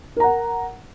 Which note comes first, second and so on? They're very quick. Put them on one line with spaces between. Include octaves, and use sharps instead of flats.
A#4 A#5 F#5